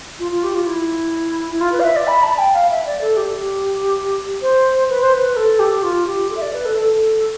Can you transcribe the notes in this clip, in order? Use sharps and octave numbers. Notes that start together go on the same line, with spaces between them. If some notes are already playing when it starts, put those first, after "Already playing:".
F4
F4
G4
F4
E4
E4
F4
B4
F5
E5
D5
B5
A5
G5
F5
E5
D5
A4
G4
G4
C5
B4
C5
B4
A4
G4
G4
F4
G4
A4
E5
D5
B4
A4
A4